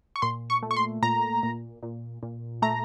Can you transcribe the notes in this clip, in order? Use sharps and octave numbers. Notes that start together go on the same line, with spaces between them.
C#6
A#2 C6
C#6
A3
C#6
C6
A#2 A#5
A#2
A#2
A#2
A3 A#5